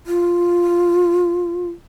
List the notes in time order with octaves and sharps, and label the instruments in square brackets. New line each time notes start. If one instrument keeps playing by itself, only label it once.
[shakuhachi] F4